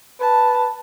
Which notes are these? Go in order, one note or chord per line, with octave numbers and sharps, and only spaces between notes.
B4 A5